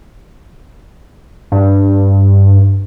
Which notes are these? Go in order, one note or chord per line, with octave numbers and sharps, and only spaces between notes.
G2